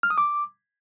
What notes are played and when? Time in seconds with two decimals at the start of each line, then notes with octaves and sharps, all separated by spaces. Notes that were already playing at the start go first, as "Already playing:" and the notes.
0.03 F6
0.10 D#6
0.18 D6